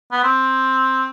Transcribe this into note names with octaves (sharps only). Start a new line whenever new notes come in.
B3
C4